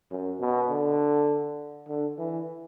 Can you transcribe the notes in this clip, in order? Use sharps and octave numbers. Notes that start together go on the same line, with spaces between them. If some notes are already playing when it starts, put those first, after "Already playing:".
F#2
B2
D3
D3
E3